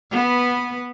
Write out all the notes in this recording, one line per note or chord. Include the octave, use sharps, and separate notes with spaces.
B3 B4